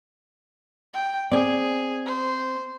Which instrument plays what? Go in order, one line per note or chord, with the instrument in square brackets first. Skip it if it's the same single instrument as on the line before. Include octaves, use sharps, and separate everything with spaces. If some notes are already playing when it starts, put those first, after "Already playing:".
[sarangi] G5
[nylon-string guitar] C4 [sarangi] G#4 [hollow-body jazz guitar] D5 G#5
[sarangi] C5